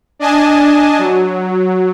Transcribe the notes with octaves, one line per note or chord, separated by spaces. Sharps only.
D4 D#5 G#5 A5
F#3